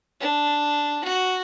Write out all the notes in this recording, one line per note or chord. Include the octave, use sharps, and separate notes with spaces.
D4
F#4